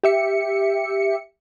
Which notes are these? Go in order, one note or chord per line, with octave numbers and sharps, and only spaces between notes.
G4 E5 C#7